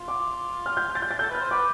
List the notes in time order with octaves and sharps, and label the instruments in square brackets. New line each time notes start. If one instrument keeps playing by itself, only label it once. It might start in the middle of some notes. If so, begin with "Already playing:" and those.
Already playing: [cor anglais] F4
[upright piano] D6
F6
G6
A6
G6
A6
[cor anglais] A4 [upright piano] G6
[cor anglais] B4
[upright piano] F6
[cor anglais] C5
[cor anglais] B4 [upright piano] D6